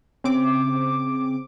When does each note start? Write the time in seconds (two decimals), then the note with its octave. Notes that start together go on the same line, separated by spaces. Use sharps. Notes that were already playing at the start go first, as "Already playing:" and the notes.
0.24 C#3 C4 D6